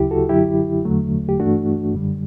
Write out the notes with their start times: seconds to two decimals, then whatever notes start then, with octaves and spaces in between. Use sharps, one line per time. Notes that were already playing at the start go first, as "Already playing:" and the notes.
Already playing: D2 C#3 F#3 E4 G4
0.11 F#4 A4
0.29 F#2 D3 F#3 E4 G4
0.85 E2 D3 F#3 A3
1.29 G4
1.40 G2 E3 A3 D4 F#4
1.95 F#2 D3 G3